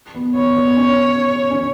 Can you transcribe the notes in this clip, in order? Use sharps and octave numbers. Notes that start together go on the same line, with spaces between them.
B3
B3 C#5
B3
C#4
C#4